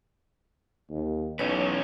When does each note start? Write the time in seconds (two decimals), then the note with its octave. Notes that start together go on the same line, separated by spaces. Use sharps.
0.90 D#2
1.39 B1 E3 C#4 B4 C#5